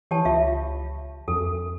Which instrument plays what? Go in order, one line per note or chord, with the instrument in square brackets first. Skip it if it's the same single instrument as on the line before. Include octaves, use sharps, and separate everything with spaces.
[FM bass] E3 [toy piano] G4 C#5 A5
[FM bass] C#2 [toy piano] F4 E5
[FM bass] F2 [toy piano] A4